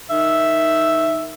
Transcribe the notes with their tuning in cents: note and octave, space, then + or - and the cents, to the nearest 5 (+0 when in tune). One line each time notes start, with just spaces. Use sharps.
D#3 +0 E5 +0